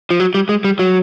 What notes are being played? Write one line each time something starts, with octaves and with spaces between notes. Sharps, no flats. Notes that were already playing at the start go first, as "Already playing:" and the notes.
F3
F#3
G3
G#3
G3
F#3